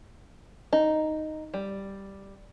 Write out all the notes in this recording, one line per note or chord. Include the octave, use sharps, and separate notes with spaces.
D#4
G3